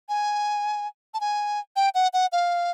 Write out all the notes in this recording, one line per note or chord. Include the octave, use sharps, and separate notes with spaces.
G#5
A5
G#5
G5
F#5
F#5
F5